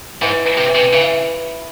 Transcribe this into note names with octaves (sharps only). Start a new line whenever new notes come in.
G#2 E3
E3
C3
E3
C3
C#3 E3